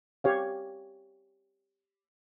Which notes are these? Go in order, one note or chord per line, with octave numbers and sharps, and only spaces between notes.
G4 C#5 F5